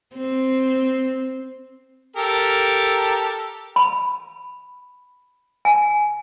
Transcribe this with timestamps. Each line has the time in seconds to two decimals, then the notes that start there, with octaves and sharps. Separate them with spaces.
0.16 C4
2.17 G4 A4 A#4
3.76 B5
5.65 G#5